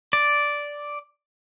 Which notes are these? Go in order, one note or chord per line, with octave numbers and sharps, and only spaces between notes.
D5